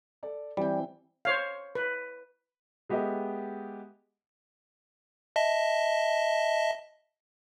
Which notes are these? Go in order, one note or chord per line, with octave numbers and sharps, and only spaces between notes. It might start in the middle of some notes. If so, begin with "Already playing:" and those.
A4 D5
E3 G3 C4 G5
C5 C#5 F5
B4
G#3 B3 G4 A4 D#5 E5
D#5 E5 A5